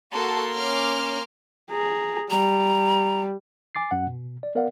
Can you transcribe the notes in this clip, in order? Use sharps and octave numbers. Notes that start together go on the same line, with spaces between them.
A#3 F#4 A4 A5 C6
C#4 D6 F6
G#4 A#5
G3 A#5
G#5 D6 A6 C7
F#2 F#5
B2
D5
B3 A#4 D5 F5 F#5